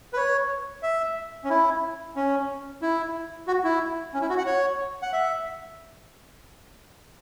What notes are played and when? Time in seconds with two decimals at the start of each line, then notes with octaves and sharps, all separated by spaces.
0.13 B4
0.17 C#5
0.83 E5
1.44 C#4
1.50 E4
2.16 C#4
2.82 E4
3.47 F#4
3.64 E4
4.14 C#4
4.22 E4
4.30 F#4
4.38 F#5
4.46 C#5
5.02 F#5
5.13 E5